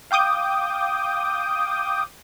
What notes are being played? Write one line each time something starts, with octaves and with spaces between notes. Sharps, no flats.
F5 G5 D6 D#6 G6